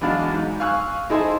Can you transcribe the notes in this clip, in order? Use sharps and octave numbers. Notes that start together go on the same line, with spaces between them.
E2 F#3 G#3 D4 F5
G#2
F5 G#5 C#6 E6 F#6
D#4 E4 G#4 A4 C5 G#5